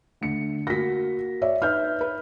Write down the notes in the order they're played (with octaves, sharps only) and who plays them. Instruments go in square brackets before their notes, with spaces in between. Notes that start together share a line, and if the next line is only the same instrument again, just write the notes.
[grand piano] D3 A3 C#7
[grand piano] A#3 F#4 [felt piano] A#6 B6
[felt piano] C#5 D5 E5
[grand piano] D#4 B4 E5 [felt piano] F6 G6
[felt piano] B4